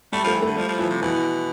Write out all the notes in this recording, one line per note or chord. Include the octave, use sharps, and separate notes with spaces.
G3 A3
F3
A3
E3
D3 A3
F3 G3
F3
E3 F3
C3
B2 E3